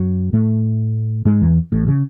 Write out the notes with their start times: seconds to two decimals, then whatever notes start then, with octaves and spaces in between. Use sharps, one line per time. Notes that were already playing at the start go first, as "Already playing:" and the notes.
Already playing: F#2 F#3
0.33 A2 A3
1.25 G#2 G#3
1.41 E2 E3
1.72 A1 A2
1.88 C#3